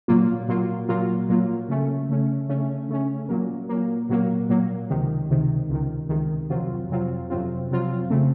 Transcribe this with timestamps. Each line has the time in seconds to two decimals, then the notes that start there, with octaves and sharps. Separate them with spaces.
0.08 A#2 F#3 A#3 F4
0.48 A#2 F#3 A#3 F4
0.89 A#2 F#3 A#3 F4
1.29 A#2 F#3 A#3 F4
1.69 C#3 A3 C#4
2.09 C#3 A3 C#4
2.49 C#3 A3 C#4
2.89 C#3 A3 C#4
3.29 A#2 F#3 A#3
3.69 A#2 F#3 A#3
4.09 A#2 F#3 A#3
4.49 A#2 F#3 A#3
4.90 C#2 C3 D#3
5.30 C#2 C3 D#3
5.69 C#2 C3 D#3
6.09 C#2 C3 D#3
6.50 F2 C3 F#3 C4 F4
6.90 F2 C3 F#3 C4 F4
7.30 F2 C3 F#3 C4 F4
7.70 F2 C3 F#3 C4 F4
8.10 C#3 A3 C4